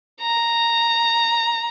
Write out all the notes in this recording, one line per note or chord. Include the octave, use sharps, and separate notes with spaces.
A#5